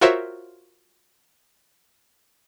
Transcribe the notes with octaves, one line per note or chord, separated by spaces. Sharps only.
F4 F#4 A#4 C5 C#5 E5